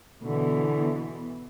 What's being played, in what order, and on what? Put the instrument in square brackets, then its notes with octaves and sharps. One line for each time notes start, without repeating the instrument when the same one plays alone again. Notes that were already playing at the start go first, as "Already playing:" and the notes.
[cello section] B2 E3 B3 [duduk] D3